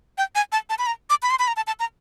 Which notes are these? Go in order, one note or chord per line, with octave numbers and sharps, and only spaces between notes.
G5
G#5
A5
A5
B5
A#5
D6
B5
C6
B5
A#5
A5
A5
A#5